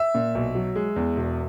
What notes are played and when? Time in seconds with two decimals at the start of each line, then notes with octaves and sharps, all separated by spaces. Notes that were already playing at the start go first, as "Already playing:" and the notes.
Already playing: E5
0.14 A#2
0.35 B1
0.55 F#3
0.76 G#3
0.96 E2
1.16 E1